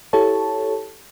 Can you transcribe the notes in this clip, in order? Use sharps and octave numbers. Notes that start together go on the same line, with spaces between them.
E4 G4 A4 C#5 A5